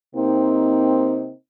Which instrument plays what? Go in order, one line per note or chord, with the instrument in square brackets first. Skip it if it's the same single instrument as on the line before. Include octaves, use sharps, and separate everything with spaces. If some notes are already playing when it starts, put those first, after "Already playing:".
[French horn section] C3 A#3 C4 D#4